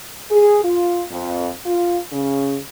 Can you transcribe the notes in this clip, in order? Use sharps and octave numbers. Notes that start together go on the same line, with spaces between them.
G#4
F4
F2
F4
C#3